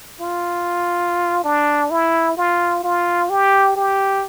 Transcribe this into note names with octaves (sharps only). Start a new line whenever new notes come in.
F4
D4
E4
F4
F4
G4
G4